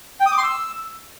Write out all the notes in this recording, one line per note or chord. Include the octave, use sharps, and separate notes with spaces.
G5
D#6
D6
C6
E6